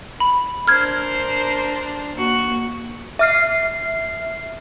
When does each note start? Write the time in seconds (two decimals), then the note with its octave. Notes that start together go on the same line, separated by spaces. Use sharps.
0.20 B5
0.67 D4 A#4 C5 F6 G#6
2.16 A#3 F#4
3.19 E5 F6 C7